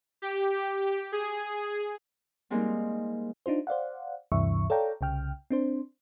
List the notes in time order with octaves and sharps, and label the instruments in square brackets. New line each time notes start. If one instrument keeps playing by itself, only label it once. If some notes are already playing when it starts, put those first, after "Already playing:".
[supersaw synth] G4
G#4
[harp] G3 G#3 A#3 C4 D#4
[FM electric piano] D4 D#4 F4 C5
C5 D5 F5 F#5
D2 G2 C3 E3 E5 C#6
A4 C#5 D5 F5 G5 A#5
C2 C#3 G5 F6
C4 D4 C5